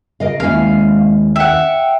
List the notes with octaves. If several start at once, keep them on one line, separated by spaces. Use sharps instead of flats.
C#3 A#4 D#5 F5
D#2 G#3 C#4 E4 F5
E5 F#5 G5